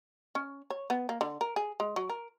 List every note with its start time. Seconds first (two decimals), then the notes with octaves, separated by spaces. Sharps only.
0.35 C#4
0.70 C#5
0.90 B3
1.09 A#3
1.21 D3
1.41 A#4
1.56 G#4
1.80 G#3
1.96 F#3
2.09 A#4